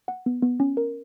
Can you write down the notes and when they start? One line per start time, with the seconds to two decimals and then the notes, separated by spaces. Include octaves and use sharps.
0.08 F#5
0.26 B3
0.42 B3
0.60 C#4
0.77 A#4